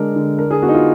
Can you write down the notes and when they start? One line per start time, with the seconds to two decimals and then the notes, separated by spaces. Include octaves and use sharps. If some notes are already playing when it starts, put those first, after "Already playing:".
Already playing: D3 G#3 D4 A#4
0.16 D3
0.38 D4 A#4
0.51 G#4
0.62 B3 F#4
0.68 D#4
0.74 F4